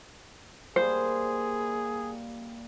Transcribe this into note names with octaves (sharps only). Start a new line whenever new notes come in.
G3 A#3 G#4 C5